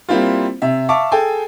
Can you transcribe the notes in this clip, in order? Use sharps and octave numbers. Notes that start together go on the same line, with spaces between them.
G3 A#3 C4 E4 F4
C3 E5
E5 F5 A5 C#6 D6
G#4 A4 G5 G#5